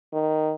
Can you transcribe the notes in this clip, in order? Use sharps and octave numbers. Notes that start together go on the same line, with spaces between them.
D#3